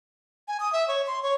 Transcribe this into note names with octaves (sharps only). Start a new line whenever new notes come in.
G#5
D#6
E5
C#5
C6
C#5